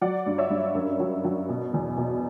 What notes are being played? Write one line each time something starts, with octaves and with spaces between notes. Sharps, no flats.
F#3 D5 F#5
G2
C#5 E5
G2
F#2
F#3
F#3
B2
E2
B2